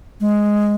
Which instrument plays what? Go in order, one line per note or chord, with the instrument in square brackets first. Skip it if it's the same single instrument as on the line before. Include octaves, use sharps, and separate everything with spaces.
[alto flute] G#3